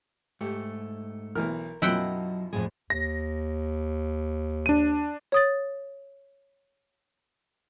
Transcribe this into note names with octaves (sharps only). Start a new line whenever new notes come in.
G#2 A3 G4
B1 E3 A#4 F6
F#2 B2 F3 F#3 E4 D#5 F#5 G5
F2 A2 G#3 G#4
D#2 A#6
D4 D#7
C#5 D#6 A6